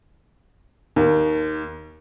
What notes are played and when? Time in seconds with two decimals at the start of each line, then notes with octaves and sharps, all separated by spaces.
0.96 D#2